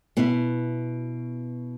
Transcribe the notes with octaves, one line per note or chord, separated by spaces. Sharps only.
B2 B3 E4